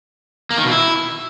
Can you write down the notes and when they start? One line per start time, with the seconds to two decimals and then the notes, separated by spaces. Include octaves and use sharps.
0.51 A#3
0.58 D#3
0.65 B2
0.72 E4